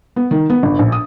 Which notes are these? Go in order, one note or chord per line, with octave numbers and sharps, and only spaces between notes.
B3
D#3
B3
G1
A#1
D#6